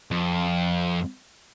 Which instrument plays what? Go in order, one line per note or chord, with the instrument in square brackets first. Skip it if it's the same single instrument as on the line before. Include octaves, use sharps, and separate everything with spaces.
[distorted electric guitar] F2